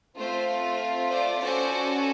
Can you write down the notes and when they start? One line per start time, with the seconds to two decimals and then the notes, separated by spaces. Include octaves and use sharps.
0.18 A3 C4 F4 C5
1.11 C5 D5
1.41 C#4 F#4 A4 C5 D5